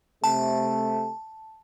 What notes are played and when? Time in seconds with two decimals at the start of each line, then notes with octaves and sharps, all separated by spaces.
0.24 C3 A3 A5